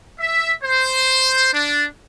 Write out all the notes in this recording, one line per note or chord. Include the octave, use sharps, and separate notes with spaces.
E5
C5
D4